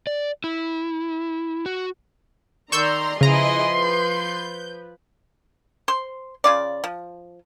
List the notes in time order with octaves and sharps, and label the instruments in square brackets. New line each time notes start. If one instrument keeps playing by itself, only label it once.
[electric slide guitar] D5
E4
F#4
[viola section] D#3 D5 [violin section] A#5 C6 [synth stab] C#6 E6 G6
[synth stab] C#3 A#5 [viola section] F3 B4 [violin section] E4 G#4 D#5 [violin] C6
[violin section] G6
[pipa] C5 C6
C#3 F4 D5
F3